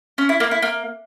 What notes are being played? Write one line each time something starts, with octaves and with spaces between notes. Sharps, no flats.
C#4
E4
A#3
E4
A#3